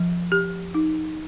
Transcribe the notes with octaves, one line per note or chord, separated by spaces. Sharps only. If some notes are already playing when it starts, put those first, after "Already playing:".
Already playing: F3
G4
D#4